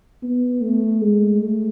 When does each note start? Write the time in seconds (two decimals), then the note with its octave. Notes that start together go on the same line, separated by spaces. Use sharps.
0.23 B3
0.62 A3
1.01 G#3
1.41 A3